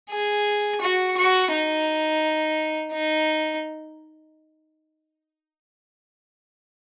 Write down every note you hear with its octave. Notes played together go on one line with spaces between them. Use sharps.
G#4
F#4
F#4
D#4
D#4